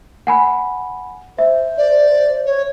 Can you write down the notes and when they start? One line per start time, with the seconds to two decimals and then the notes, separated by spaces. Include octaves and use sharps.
0.27 F#5 G#5 B5
1.39 C5 E5
1.78 D5
2.46 C#5